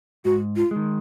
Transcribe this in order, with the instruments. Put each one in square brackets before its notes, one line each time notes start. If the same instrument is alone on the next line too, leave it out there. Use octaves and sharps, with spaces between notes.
[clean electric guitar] G#2 [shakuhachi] F#4
[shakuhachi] F4
[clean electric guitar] D#3 G#3